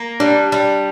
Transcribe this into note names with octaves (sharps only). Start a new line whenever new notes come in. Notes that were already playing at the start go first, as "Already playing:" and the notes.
Already playing: A#3
G3 D4
G3